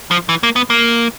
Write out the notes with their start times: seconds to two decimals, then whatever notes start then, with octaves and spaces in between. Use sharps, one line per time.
0.11 F3
0.29 E3
0.43 A#3
0.56 B3
0.70 A#3